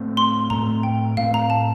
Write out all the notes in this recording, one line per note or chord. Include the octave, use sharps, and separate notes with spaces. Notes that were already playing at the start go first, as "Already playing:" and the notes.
Already playing: A2 A3 C4
C6
A2 A3 C4 A#5
G5
A2 A3 C4 F5
A#5
A5